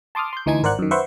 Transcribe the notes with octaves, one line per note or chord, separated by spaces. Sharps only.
A5 C6 D6 D#6 F6
C6 G6
D2 E3 D#4 G#5 G#6
G#1 A#4 C5 D5 F#5 F#6
F#2 D#3
B4 C5 E5 F#5 C6 C#6